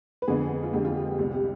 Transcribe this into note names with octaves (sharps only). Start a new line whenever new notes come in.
B4
F2 D3 G#3 B3 G#4
F4
F2 D3 G#3 B3 G4
F4
G4
G4
C2 C3 G3 G4
G4